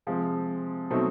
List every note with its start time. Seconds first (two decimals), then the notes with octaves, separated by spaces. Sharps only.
0.07 C3 F3 G#3 C4
0.90 B2 F#3 A3 C4 D#4